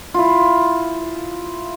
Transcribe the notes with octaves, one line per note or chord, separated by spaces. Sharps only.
E4 F4